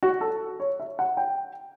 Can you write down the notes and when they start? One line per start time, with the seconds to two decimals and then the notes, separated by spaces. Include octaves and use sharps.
0.03 F#4
0.21 A4
0.60 C#5
0.80 E5
0.99 F#5
1.17 G5